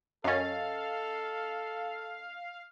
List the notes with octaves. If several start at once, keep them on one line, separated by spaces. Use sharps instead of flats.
F#2 C#4 A4 D#5 F5 A6